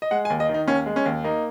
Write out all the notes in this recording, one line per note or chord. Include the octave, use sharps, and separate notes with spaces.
D#5
G#3 F#5
G#5
D#2
D#5
D#3
D#4
D#2 C#4
G#3
C#4
D#2
A#3 D#4